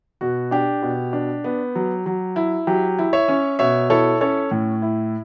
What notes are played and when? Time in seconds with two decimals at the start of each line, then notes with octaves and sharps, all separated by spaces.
0.21 B2 F#4
0.51 D4 G4
0.82 B2
1.13 D4
1.44 B3
1.75 F#3
2.06 F#3
2.36 E4
2.67 F#3 G4
2.99 E4
3.13 C#5 E5
3.28 C#4
3.59 B2 C#5 E5
3.90 E4 A4 C#5
4.21 C#4 A4 C#5
4.51 A2
4.82 E4